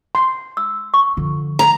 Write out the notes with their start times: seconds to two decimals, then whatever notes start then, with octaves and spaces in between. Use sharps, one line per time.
0.15 C6
0.57 E6
0.94 C#6
1.17 D3 F3
1.59 A#5